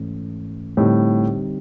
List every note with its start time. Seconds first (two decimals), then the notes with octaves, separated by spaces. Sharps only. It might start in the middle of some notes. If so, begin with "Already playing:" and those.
Already playing: G#2 E3 A3 C#4
0.77 A2 D3 G3 C4 D#4 G4